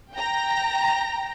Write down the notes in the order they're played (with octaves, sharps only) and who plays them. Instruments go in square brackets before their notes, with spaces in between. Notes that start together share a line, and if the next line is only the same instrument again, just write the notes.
[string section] G5 A#5